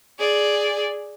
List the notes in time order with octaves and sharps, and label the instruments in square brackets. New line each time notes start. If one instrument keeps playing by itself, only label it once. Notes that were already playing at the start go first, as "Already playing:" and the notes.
[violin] G#4 D5